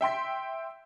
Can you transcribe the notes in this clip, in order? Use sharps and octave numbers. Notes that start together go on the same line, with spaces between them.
E5 G5 C6 B6